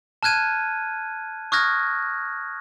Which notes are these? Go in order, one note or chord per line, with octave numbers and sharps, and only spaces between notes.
A5 F6 F#6 G#6 D#7
C#6 D#6 F6 F#6 G#6 A#6